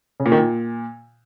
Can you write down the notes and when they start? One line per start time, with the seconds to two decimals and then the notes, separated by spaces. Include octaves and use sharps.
0.20 C#3
0.26 A#2
0.32 D#3
0.38 A#2